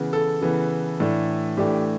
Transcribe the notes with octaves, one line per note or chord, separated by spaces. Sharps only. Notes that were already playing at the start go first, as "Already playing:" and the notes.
Already playing: C#3 E3 B3
A4
C#3 E3 B3
A2 E3 A3 D4
A2 E3 A3 D4 G4